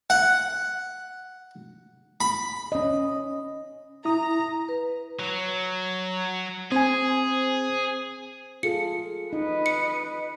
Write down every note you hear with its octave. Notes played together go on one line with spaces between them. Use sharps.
F#5
B5
C#4 D#5
E4 A#5 D#6
B4
F#3
C4 G#4 C5 G#5
F4 G#4 A4 C#7
D#4 B4 D#5
C#7